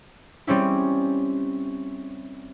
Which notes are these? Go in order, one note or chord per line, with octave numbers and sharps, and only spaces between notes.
G3 C4 C#4 E4